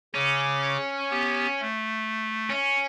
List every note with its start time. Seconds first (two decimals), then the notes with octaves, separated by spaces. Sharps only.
0.14 C#3 C#4 D6
1.11 B3 G4
1.61 A3
2.50 C#4